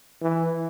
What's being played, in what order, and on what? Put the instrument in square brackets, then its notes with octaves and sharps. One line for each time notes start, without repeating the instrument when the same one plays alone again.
[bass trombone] E3